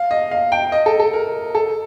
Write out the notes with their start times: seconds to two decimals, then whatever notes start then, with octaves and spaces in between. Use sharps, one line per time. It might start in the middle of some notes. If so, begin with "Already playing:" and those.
Already playing: F5
0.11 D#5
0.31 F5
0.52 G5
0.72 D#5
0.86 A4
1.00 A4
1.13 A#4
1.55 A4